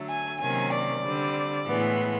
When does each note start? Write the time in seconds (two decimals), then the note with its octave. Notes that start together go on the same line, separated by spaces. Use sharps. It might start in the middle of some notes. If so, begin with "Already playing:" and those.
Already playing: D3 F#3 A3
0.10 G#5
0.41 C3 D#3 F#3 A#3 C#4 G#5
0.72 D5
1.04 D3 G3 C4
1.67 A2 E3 G#3 B3